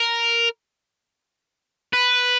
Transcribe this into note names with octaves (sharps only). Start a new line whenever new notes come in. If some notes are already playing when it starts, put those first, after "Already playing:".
Already playing: A#4
B4